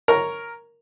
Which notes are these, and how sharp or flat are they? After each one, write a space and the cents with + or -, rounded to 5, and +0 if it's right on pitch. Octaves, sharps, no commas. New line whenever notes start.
A#4 +0 C#5 +0 A#5 +0